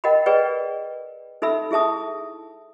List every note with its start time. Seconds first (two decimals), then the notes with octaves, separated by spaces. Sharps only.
0.04 A#4 D#5 F#5 G5 B5
0.26 G#4 B4 D5 D#5 G5
1.42 D#4 A4 E5 B5 E6
1.71 E4 G#4 E5 A5 D#6